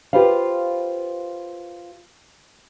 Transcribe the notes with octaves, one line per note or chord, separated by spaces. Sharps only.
F4 G4 B4 C5 F5